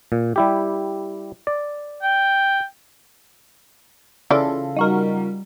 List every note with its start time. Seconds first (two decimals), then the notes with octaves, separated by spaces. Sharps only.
0.12 A#2
0.36 G3 E4 G4
1.47 D5
2.03 G5
4.31 C#3 E3 F4 A4 D5
4.77 G3 D#4 F#4 A#4